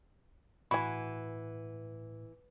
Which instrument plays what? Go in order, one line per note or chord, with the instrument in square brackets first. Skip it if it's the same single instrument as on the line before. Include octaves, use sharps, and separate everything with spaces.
[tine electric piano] A2 [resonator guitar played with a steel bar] E3 [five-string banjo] F#4 G#5 [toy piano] B5